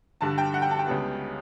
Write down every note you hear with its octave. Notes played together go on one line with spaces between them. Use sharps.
G2 D3 G3 A5
G5
F#5
G5
A5
G5
C#2 C#3 G3 B3